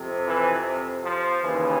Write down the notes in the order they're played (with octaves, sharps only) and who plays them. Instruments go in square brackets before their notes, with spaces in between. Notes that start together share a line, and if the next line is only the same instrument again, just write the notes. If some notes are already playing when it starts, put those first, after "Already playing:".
Already playing: [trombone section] F2 C3
E3
F3
D#2 C#3 E3